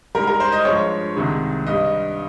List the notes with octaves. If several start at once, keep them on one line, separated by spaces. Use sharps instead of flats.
G#2 G3 A#4
A#4
C5
D#5
G2 F3 G#3 C#5
C2 C3 D#3 G#3
G2 G3 D#5